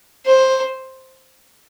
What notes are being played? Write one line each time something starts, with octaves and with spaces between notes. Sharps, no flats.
C5